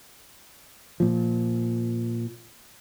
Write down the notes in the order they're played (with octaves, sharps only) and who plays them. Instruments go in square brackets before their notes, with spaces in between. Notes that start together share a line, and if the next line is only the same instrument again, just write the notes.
[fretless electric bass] A#2 F3